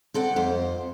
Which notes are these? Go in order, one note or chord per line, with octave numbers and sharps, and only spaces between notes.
C4 A4 D5 F#5
F2 C5